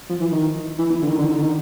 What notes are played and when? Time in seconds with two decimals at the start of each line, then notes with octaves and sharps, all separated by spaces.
0.10 F3
0.20 E3
0.32 D#3
0.78 E3
0.90 E3
1.02 D3
1.09 D#3
1.18 D3
1.26 D#3
1.34 D3
1.43 D#3